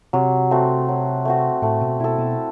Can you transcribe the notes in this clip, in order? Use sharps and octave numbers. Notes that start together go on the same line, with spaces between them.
C3 F#3
A3 C4 F#4
F#3
A3 C4 F#4
A2 A3
B2
B2 E4 A4
B2